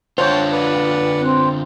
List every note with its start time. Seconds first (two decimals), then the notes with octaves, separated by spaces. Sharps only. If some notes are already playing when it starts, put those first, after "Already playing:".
0.18 D3 F4 C5 C#5 F#5 G5 A5
0.52 B4 D5 F#5
1.21 C4